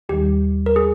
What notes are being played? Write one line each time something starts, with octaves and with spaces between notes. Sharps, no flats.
D#2 D#3 G3 G4
A#4
G#4